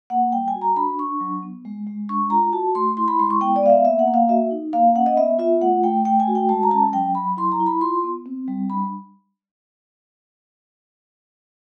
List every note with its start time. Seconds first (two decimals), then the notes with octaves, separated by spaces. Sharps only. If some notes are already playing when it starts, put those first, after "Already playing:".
0.10 A#3 F#5
0.32 G3 G5
0.48 G#5
0.55 F#4
0.62 A#5
0.76 D4 B5
0.99 D4 C#6
1.20 F#3
1.43 B3
1.65 G#3
1.87 G#3
2.09 D4 C#6
2.30 F4 A#5
2.53 F#4 A5
2.75 A3 C6
2.97 E4 C6
3.08 B5
3.19 G#3 C6
3.30 C#6
3.41 B3 G5
3.56 D5
3.63 B3 F5
3.70 E5
3.85 A#3 E5
3.99 F#5
4.07 A#3
4.14 F5
4.29 F#4 E5
4.51 D#4
4.73 A#3 F5
4.95 C#4 F#5
5.06 D#5
5.17 B3 E5
5.39 F4 E5
5.61 A3 F#5
5.83 A3 G5
6.05 A3 G5
6.20 G#5
6.27 F#4
6.35 G5
6.49 G#3 A5
6.63 A#5
6.71 C#4 A5
6.93 F#3 G5
7.15 F#3 B5
7.37 E4 C6
7.52 A#5
7.60 E4
7.66 B5
7.81 F4 C6
8.03 B3
8.26 C4
8.48 G3
8.70 D4 B5